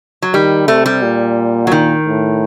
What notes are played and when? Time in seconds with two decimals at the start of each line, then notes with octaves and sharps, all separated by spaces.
0.22 F#3
0.34 D#3 G3
0.68 C3 A3
0.86 G3
1.03 A#2
1.67 F#3
1.72 D#3
2.06 A2